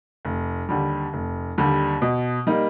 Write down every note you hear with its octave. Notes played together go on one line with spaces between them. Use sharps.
F1
D#2 D3 G3
F1
D#2 D3 G3
B2
G3 A#3 D#4